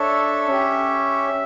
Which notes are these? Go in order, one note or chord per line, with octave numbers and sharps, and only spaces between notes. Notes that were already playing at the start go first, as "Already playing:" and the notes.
Already playing: D4 A4 C#5 E5
C#4 G4